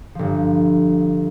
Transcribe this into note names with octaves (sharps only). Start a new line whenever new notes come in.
G1 F3